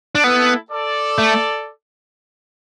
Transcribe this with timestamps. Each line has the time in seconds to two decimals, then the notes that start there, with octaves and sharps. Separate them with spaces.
0.15 D4
0.24 B3 E4 A4
0.71 A4 D5
1.18 A3